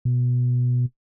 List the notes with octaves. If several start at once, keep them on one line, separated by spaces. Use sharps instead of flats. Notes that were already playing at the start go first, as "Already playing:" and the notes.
B2